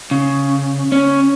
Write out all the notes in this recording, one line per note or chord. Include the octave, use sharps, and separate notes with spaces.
C#3
C#4